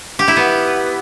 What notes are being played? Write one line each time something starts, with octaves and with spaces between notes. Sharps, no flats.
G4
E4
B3